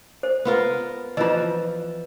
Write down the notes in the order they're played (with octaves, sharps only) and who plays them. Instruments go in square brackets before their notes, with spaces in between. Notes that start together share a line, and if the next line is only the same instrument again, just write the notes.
[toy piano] C5
[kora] B3 F4 A#4
[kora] E3 F3 [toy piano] F4 D#5